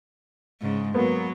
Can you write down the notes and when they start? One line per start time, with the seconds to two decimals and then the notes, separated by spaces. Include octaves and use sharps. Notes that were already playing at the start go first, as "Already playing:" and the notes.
0.62 G#2 C#3
0.94 F#3 A#3 B3